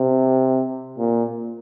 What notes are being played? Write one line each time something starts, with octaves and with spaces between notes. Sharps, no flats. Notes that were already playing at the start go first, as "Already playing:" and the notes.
Already playing: C3
A#2